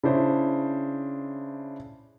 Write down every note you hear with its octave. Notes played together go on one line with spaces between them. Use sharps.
C#3 D4 E4 C5